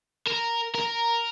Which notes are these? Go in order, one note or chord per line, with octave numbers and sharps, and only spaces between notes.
A#4
A#4